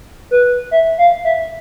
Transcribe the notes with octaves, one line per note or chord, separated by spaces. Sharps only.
B4
E5
F5
E5